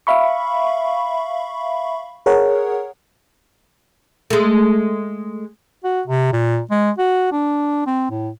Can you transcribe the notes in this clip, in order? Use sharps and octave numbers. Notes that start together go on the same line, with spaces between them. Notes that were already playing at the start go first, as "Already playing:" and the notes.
E5 F5 B5 C#6
G#4 A#4 C#5 F#5
G#3 A3
F#4
C3
A#2
G#3
F#4
D4
C4
A2